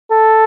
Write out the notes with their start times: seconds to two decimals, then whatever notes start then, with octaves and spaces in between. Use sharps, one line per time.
0.11 A4